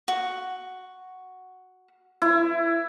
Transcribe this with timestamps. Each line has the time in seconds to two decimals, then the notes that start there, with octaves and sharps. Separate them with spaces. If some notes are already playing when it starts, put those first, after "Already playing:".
0.08 F#4
2.22 E4